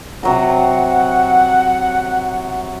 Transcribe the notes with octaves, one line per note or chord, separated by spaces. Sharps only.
C3 F#3 F#5 A#5